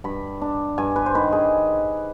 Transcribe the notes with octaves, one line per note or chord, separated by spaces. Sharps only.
G2 B5
D4
G2 G#5
B4
C5
D#3 B4
G#4